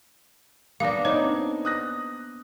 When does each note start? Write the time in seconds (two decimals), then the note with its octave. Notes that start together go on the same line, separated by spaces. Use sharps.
0.80 A#3 B3 D4 D5 F5
1.05 C4 D4 D#4 C#5
1.65 D#6 F#6 A#6